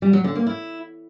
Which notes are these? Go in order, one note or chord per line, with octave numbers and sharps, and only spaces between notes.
G3
F#3
D3
A#3
E4